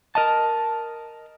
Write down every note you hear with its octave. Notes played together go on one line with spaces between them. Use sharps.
A#4 D#5 A5